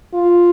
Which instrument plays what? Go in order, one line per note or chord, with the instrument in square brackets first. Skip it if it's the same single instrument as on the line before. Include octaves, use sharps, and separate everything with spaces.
[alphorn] F4